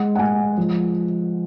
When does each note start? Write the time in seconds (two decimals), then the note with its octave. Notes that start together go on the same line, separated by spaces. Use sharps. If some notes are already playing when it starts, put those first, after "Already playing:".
Already playing: G#3 F#5
0.15 F#5
0.19 G#3 G#5
0.57 F3